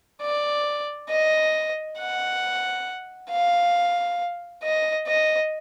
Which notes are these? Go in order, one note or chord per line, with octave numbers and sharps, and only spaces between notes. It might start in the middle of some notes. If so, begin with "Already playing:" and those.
D5
D#5
F#5
F5
D#5
D#5